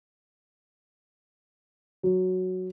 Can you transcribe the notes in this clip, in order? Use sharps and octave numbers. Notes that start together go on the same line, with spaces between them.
F#3